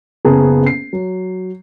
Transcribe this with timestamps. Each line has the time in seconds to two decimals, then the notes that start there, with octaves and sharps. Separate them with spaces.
0.25 F#1 C#3 B3 G#4 A5 A#5
0.66 C7
0.93 F#3